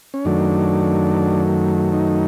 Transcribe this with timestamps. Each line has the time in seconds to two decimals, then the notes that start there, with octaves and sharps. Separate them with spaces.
0.14 C#4
0.25 F#2 D#3 F#3 A3 D4
1.93 D#4